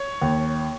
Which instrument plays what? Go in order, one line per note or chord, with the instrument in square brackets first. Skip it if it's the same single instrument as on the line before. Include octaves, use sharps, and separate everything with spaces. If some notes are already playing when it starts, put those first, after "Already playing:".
Already playing: [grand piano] C#5
D#2